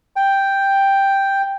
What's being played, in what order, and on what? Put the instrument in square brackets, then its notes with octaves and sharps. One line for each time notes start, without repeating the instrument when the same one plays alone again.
[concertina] G5